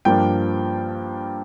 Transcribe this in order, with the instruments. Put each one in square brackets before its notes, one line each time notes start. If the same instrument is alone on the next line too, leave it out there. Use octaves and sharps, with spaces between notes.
[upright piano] G2 F3 A#3 D4 G5